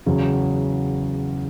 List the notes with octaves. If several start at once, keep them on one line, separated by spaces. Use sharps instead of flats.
E2 C#3 F#3